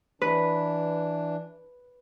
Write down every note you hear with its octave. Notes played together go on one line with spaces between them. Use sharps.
E3 D4 B4